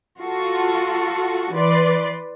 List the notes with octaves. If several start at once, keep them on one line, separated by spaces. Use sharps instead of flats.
F4 F#4 A4
E3 B4 D5 C6 D6